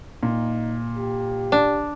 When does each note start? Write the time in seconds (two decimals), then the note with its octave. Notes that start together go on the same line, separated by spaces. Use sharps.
0.23 A#2 D#4
0.95 G4
1.52 D4